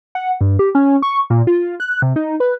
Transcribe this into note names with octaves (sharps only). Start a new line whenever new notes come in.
F#5
G2
G4
C#4
C#6
A#2
F4
F#6
C3
D#4
B4